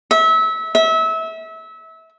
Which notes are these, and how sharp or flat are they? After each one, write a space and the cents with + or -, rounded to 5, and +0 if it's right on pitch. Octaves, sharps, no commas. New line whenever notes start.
E5 -25
E5 -25